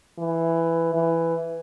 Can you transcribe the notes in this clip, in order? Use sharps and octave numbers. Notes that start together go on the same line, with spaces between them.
E3
E3